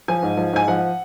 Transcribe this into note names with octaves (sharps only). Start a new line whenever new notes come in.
F3 G#5
G#2
F3
G#2 G#5
F3 F#5